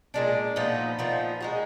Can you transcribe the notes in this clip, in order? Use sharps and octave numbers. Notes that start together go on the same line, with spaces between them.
A#2 G#3 D4
A#2 F3 B3 D#4
A#2 F3 B3 D#4
G#3 D#4 F#4